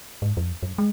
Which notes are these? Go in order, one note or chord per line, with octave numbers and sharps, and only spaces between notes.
G#2
F2
F#2
G#3